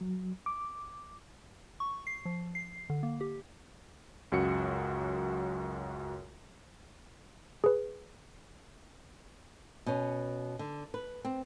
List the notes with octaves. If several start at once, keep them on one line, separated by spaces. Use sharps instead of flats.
F#3
D6
C#6
C7
F3
C7
D3
A#3
G4
C#2 F#2 F#4 C#7
G#4 B4
B2 C#4
D3
B4
C4